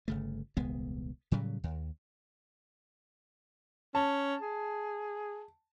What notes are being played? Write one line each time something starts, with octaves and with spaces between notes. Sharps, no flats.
G1 C#3 A3
D#1 C2 G#3 B3
A2 C#3 F#3 G3
D#2
C#4 A5
G#4